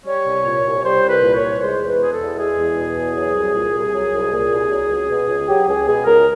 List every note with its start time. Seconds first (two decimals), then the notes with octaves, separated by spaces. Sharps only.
0.06 G3 C#5
0.26 C2
0.44 A#2
0.64 C2
0.83 G3 C5
1.03 C2
1.09 B4
1.22 A#2
1.35 C#5
1.42 C2
1.61 G#3 C5
1.80 E2
1.87 B4
2.00 B2 G#4
2.12 A4
2.19 E2
2.38 G#3 G#4
2.58 E2
2.77 B2
2.97 E2
3.16 F#3
3.35 C2
3.54 A#2
3.74 C2
3.93 F#3
4.12 C2
4.32 A#2
4.50 C2
4.71 F#3
4.90 C#2
5.09 B2
5.28 C#2
5.48 F#3 G4
5.67 C#2 G#4
5.86 B2 G#4
6.06 C#2 A#4